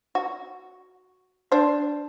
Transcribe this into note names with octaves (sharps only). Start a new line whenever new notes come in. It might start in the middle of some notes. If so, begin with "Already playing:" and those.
F#4
D4 C5